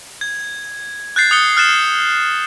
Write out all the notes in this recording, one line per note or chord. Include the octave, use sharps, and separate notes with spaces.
G#6
F#6 G6 A6 C7
D#6 F#6 C#7 G7
F6 F#6 A6 E7